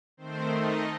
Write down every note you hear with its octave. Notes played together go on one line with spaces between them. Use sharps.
D#3 A3 C4 C5
D#4 D#5